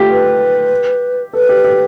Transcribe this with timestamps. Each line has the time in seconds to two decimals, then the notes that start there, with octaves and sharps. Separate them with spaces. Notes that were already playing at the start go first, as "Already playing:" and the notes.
Already playing: A3 F4 G4
0.09 B4
1.33 A4 B4
1.49 G4
1.64 G4